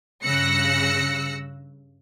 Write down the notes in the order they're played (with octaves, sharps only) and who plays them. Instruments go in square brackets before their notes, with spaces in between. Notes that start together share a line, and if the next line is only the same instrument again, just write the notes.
[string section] G2 C#3 E6 F#6 A#6 C#7